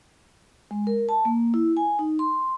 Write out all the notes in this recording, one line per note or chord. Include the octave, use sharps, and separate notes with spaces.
G#3
A#4
A5
A#3
E4
G#5
D#4
C6